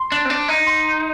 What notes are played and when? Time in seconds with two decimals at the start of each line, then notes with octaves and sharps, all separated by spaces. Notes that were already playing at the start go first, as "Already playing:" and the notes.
Already playing: C6
0.12 D4
0.25 C4
0.30 D4
0.48 D#4
0.67 C6